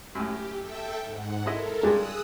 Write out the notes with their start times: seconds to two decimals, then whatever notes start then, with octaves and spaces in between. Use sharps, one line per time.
0.15 F#2 A2 G4
0.58 A4 E5 G5
1.04 G#2 F#5
1.46 G#3 E4 A4 A#4 D#5
1.83 G2 G3 G#3 G#4 D#6 E6 F#6